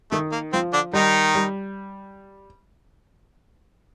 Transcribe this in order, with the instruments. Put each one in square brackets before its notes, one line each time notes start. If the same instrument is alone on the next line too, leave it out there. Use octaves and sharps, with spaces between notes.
[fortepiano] D#3 [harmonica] A3
[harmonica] A#3
[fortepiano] F3 [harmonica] C4
[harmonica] D3 D4
[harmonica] D#3 D#4 [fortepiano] G3
[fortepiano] G3